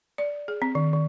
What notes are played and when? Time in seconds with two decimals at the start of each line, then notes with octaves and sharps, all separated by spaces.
0.18 D5
0.48 G#4
0.62 C4
0.75 D#3
0.93 D#3